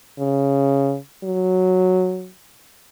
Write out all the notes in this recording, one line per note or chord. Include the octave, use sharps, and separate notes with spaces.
C#3
F#3